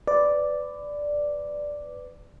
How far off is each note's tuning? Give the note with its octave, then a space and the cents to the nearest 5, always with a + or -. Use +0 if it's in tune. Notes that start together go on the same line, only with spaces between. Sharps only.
B4 +25 D5 +0